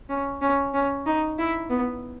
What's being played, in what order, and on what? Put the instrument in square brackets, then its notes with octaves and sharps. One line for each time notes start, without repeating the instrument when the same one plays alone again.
[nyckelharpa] C#4
C#4
C#4
D#4
E4
B3